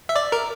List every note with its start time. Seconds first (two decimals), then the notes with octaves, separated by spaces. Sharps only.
0.09 E5
0.16 D5
0.32 A#4